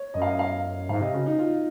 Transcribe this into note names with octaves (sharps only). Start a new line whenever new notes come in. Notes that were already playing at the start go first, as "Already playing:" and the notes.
Already playing: C#5
F#2 D#5
F5
D#5
F5
G#2 F5
C3 D#5
C#3 F#4
D#4
F4